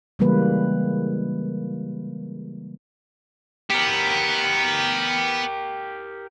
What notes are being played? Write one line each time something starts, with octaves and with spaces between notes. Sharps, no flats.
C#3 E3 G3 G#3 A#3 B4
B3 G4 A#4